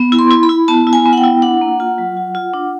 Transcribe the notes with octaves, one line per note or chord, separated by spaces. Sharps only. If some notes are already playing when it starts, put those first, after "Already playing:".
Already playing: B3
E4
C6
E4
B5
E4
B3 A5
E4
G#5
B3
F#5
G5
E4
D4 F#5
A#3
F4
F#3
F4
F4
D4